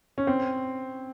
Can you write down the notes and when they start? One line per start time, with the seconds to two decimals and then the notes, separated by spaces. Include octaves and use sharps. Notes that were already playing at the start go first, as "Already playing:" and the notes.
0.18 C#4
0.27 C4